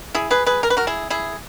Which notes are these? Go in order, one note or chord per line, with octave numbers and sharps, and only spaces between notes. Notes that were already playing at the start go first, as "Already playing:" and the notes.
E4 G#4
G#4 B4
G#4 B4
A#4
B4
F#4 A#4
E4 G#4
E4 G#4